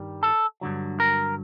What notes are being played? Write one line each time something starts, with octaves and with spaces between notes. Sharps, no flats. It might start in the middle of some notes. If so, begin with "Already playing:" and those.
Already playing: G2 D#3 G3
A4
G2 D3 F#3
A#4